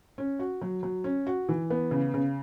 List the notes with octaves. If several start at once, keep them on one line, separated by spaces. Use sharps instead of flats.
C#4
F#4
F#3
F#3
C#4
F#4
E3
B3
C#3
C#3